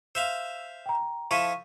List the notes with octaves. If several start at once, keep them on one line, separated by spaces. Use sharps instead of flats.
C5 E5 F5 E6
G5 A#5
F3 E4 A4 C#6 B6 D#7